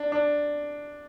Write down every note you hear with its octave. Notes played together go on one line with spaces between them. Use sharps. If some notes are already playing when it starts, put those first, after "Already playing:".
Already playing: D4
D4